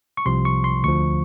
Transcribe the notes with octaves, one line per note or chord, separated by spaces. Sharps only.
C#6
C2 C3 F3 C6
C#6
C6
D2 D3 F3 C#6